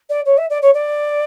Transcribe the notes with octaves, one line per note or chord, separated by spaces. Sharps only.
D5
C#5
E5
D5
C#5
D5